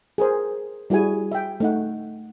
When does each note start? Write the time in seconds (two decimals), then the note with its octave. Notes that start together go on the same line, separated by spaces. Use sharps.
0.18 G#4 A#4 C5
0.90 G3 E4 F#4 G#4 G#5
1.32 E5 G5
1.60 A3 D#4 F#5